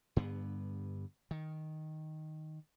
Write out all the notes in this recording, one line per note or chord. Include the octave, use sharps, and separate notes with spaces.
G2 D3 B3
D#3